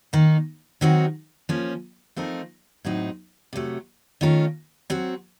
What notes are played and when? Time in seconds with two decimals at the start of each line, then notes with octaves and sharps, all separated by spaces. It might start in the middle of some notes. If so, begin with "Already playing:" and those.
0.13 D#3 A#3 D#4
0.81 D#3 F#3 C4 D#4 F#4
1.49 F3 A#3 C#4
2.16 F3 A3 C4 D#4 A#4
2.85 A2 F#3 C4 D#4
3.53 C3 F#3 A3
4.21 D#3 A3 C#4 F4 A#4
4.90 F#3 C4 F#4